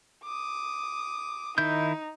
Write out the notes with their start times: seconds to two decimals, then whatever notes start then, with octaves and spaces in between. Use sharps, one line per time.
0.24 D6 D#6
1.58 D#3 D#4 E4 G6